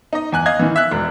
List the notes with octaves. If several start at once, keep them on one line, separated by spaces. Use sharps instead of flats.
D#4 D#5
E2 G#5 F#6
D#5 F5 G#6
D#3 E3
E5 F#6
E1